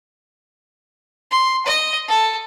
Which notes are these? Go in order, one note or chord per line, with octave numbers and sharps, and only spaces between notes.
C6
D#5
A4